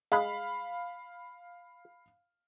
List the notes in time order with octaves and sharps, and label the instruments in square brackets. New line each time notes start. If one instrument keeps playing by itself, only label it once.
[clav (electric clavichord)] G#3 [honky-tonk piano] F5 B5